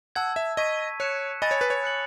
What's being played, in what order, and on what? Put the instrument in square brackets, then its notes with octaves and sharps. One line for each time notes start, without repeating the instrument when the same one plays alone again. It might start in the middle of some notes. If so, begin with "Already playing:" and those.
[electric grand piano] F#5 [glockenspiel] A5 E6 G#6
[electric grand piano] E5
[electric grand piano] D#5 [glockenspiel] C#6 G#6 B6 D#7
[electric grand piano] C#5 [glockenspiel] F#6 C#7 E7
[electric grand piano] D#5 [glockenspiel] G#5 B5 D#6 A6
[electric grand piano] C#5
B4
C#5
[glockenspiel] F#6 C#7 F#7